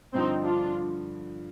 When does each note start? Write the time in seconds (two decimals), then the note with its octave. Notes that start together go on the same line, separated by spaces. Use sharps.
0.14 G2 D3 F3 C4 D#4
0.43 D4 F4